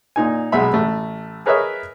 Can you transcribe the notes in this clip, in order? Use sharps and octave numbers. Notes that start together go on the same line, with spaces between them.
A#2 D#4 G#5
B1 G#3 E5 B5
A1 A3
G#4 A#4 B4 C#5 D#5 E5